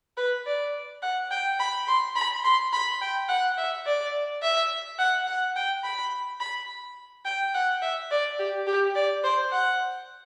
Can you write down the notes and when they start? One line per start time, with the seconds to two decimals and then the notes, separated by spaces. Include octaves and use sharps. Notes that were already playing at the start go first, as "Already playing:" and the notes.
0.17 B4
0.46 D5
1.02 F#5
1.31 G5
1.59 B5
1.88 C6
2.16 B5
2.44 C6
2.73 B5
3.01 G5
3.29 F#5
3.57 E5
3.86 D5
4.42 E5
4.99 F#5
5.27 F#5
5.56 G5
5.84 B5
6.40 B5
7.25 G5
7.54 F#5
7.82 E5
8.11 D5
8.39 G4
8.67 G4
8.95 D5
9.24 C5
9.52 F#5